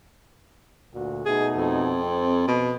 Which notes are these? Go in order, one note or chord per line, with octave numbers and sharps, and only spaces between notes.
D2 A#2 F#4
B2 A3 D#4 G#4
F2
C4
B2